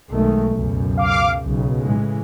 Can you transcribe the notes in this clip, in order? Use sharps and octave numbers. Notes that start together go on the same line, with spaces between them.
B1 D#3 G#3 A3
C#2 F#2 B2
F5 D6
B1 C#3
A2 E3 G#3